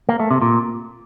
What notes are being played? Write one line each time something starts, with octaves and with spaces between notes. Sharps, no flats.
A#3
A3
C3
A#2